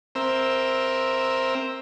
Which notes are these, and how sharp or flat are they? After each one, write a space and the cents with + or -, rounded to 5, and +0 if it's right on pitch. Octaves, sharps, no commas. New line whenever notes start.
C4 +5 A#4 +0 E5 +0